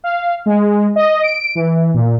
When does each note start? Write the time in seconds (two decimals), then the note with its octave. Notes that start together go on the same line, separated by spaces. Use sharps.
0.04 F5
0.46 G#3
0.96 D#5
1.23 D7
1.55 E3
1.94 A#2